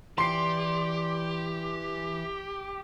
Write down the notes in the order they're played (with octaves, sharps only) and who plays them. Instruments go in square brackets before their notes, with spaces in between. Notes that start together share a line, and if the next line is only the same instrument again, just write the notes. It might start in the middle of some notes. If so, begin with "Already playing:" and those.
[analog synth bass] E3 [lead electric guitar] G4 [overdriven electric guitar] D5 [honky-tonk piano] C6 C7